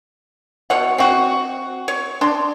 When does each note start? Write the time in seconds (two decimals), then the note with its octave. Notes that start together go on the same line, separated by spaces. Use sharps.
0.70 B2 C#5 F#5
0.98 C4 F#4
1.88 C#5
2.21 D4 C6